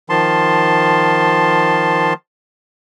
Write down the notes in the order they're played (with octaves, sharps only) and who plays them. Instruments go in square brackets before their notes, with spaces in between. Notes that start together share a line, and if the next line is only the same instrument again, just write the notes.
[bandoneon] D#3 F3 A5 C6